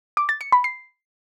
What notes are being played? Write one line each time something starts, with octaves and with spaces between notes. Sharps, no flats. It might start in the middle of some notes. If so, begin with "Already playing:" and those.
D6
A6
C#7
B5
C7